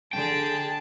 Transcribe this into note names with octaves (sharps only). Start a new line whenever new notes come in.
D3 G#4 G5 A5